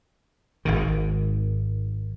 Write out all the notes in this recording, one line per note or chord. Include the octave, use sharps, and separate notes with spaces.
G#1 G#2 D#3